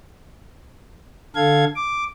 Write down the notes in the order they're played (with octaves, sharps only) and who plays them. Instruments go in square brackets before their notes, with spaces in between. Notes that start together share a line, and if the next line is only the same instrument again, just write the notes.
[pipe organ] D3 A4 F5 G#6
D6